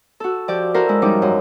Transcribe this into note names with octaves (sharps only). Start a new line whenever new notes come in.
F#4 A4
F3 G4 D5
E4 F#4 A4 A#4 C5
G#3 E4
G#2 F3 G3 C#4 D#4 D6
F#2